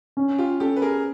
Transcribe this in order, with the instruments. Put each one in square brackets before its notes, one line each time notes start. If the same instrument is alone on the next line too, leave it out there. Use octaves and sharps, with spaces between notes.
[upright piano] C#4
[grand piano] F4 G4
[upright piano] C#4 [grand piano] G4 A4
[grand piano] B4
G#4 A#4